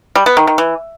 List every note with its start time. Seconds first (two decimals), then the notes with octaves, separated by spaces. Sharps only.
0.15 G3
0.26 B3
0.37 D#3
0.47 D#3
0.58 E3